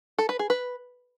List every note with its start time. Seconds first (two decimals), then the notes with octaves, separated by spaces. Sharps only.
0.18 A4
0.29 B4
0.39 G#4
0.50 B4